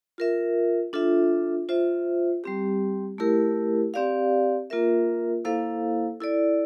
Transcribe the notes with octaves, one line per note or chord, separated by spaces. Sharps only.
F4 A#4 E5
D4 F4 A4 E5
F4 C5 E5
G3 C4 G4
A3 E4 G4 A#4
C4 G4 D5 F5
A#3 F4 A#4 E5
A#3 E4 A4 C5 F5
E4 A4 D5